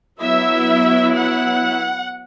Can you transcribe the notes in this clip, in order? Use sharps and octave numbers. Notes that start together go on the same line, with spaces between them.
F#3 B3 E4 E5
F#5